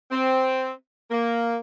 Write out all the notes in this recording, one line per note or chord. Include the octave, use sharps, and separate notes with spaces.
C4
A#3